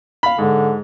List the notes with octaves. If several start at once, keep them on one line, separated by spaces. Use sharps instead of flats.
F5 B5
G#2 D3